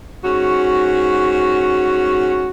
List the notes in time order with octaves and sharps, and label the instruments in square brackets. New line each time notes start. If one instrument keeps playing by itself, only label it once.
[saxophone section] G#2 C#4 F#4